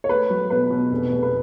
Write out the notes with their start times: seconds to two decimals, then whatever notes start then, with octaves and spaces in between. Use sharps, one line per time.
0.04 C#5
0.09 A3 B4
0.30 F#3
0.50 B2 B4
0.70 B2
0.91 F1
1.11 F1
1.23 B4